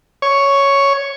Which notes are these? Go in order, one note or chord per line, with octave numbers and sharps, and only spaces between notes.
C#5